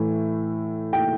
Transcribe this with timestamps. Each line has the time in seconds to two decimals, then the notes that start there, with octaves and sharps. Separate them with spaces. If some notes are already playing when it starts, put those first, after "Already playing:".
Already playing: A2 E3 A3
0.93 G5